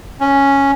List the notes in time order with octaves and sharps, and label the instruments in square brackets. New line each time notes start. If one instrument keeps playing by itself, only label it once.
[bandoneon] C#4